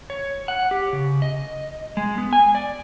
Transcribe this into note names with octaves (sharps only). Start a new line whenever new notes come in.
C#5
F#5
G4
C#3
D#5
G#3
B3
G#5
D5